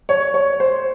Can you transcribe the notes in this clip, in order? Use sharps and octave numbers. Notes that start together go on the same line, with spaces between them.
C#5
C#5
C5